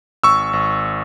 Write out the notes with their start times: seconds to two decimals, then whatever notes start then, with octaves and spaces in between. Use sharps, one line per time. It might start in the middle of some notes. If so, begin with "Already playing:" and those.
0.24 G#1 C#6 E6
0.53 G#1